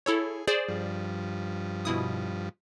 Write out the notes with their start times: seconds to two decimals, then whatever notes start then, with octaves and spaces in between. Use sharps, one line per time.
0.06 E4 G#4 A4 C#5
0.47 G#4 C5 D5
0.68 G2 F3
1.85 B2 E4 D#6